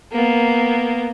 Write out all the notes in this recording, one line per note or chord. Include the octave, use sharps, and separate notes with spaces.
A#3 B3